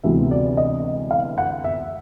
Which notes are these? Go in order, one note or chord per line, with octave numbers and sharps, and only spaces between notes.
D2 C3 E3 G#3 B3 E5
D5
D#5
F5
F#5
E5